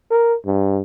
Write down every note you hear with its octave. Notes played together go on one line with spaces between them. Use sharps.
A#4
G2